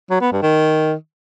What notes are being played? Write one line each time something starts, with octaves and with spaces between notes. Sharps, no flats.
F#3
B3
G2
D#3